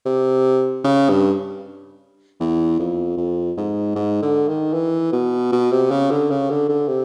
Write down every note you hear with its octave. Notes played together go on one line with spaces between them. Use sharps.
C3
C#3
G2
E2
F2
F2
G#2
G#2
D3
D#3
E3
B2
B2
C3
C#3
D3
C#3
D3
D3
C3